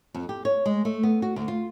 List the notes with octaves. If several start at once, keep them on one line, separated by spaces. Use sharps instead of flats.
F2
G4
C#5
G#3
A3
B3
F#4
D2
F4